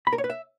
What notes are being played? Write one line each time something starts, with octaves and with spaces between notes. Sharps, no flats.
B5
A#4
C#5
B4
E5